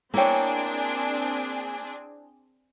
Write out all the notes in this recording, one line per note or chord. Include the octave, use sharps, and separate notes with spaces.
A#3 C4 D4 E4 G#4 C#5 G5